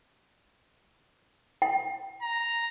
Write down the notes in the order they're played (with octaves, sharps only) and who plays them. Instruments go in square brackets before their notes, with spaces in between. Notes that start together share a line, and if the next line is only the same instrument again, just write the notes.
[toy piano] G5
[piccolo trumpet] A#5